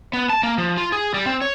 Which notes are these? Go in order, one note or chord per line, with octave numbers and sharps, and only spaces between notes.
B3
A5
A#3
F3
F4
G#4
G3
C4
C#5